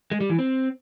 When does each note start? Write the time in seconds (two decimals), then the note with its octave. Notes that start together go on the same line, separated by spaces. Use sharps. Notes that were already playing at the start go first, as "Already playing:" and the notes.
0.11 G#3
0.21 G3
0.30 E3
0.39 C4